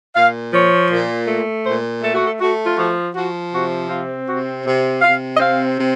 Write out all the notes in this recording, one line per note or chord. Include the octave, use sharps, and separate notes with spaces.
A#2 F5
F3 C#5
A#2
A3
A#2 C5
A3 A4
F#4
A4
A3 F#4
F4
F3 F#4
F3 F#4
C3 F#4
C4 F4
C3 F#4
C3
C3 F5
D#5
C4 F5
C3